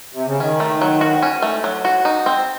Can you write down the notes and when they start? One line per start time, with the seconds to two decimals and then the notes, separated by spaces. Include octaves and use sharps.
0.14 C3
0.27 C#3
0.40 D#3 C#4
0.60 A3
0.81 F#3
1.01 F#4
1.22 C#4
1.42 A3
1.64 F#3
1.85 F#4
2.05 D#4
2.26 C4